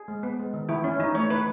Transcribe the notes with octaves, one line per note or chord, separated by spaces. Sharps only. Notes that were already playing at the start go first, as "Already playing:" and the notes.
Already playing: G#4
G#3
B3
G#3
D#3
E3 E4
C#4
E3 D#4
A3 C#5
E3 B4